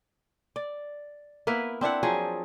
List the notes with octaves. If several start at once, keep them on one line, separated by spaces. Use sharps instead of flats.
D5
A#3 B3 E4 B4
C4 D4 E4 F#5
F3 F#3 G#4